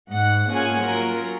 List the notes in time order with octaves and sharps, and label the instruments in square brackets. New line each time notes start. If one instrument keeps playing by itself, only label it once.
[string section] G#2 F#5
A#3 C#4 F4 G#4 F#5 G#5
F#3 F4 A#4